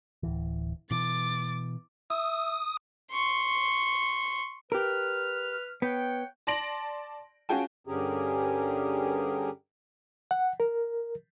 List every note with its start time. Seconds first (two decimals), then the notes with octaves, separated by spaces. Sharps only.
0.23 D1 E3
0.91 B2 E3 D6 A6
2.10 E5 D#6
3.12 C6 C#6
4.72 G4 A#4 B4 F6
5.82 B3 C#5 F#5 G5
6.47 D5 A5 C6 A#6 D7 F#7
7.49 C#4 F4 F#4 G#4 G5 A5
7.87 G2 D3 C#4 G4 G#4 A#4
10.31 F#5
10.60 A#4